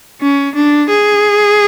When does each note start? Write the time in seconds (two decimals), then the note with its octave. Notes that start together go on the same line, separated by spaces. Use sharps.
0.21 C#4
0.55 D4
0.90 G#4